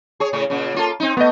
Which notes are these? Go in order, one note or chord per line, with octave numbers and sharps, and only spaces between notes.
G#4 C#5
A2 C#3 C#4
A#2 C#3
A#3 F4 A4
C4 D#4
A3 B3 D#5